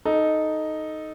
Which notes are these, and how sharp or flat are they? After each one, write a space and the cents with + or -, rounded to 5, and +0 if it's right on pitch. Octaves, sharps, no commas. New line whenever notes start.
D#4 +0 A4 -10